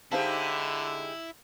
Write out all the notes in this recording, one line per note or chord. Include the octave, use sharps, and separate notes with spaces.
D3 G#3 D#4 E4 G4 C5 F5 A5